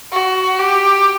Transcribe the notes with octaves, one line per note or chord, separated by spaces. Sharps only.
F#4
G4